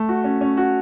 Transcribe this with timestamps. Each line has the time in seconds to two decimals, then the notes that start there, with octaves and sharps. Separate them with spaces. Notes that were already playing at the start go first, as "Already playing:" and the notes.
Already playing: A3
0.09 F#4
0.24 C#4
0.41 C#4
0.57 F#4